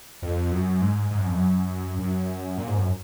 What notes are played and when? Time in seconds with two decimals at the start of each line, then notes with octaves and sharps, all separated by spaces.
0.22 F2
0.52 F#2
0.81 G#2
1.11 G#2
1.19 F#2
1.27 F2
1.35 F#2
1.99 F#2
2.58 A#2
2.68 G#2
2.78 F#2